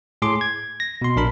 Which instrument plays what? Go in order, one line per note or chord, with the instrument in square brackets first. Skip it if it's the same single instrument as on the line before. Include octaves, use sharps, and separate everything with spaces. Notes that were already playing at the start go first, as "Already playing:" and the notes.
[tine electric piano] A2 G#4 C6 D6
G#6
A#6
B2 C6
A#1 D4 A#4 B5